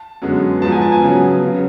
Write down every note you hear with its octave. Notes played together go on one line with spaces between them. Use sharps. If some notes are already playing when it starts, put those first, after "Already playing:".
Already playing: A5
F#2 D3 G#3 B3
G#2 F3 B3 A5
G#5
A5
G#5
C#3 F#3 B3
C#3 F#3